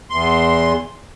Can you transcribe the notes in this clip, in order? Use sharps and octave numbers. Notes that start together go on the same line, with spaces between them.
E2 C6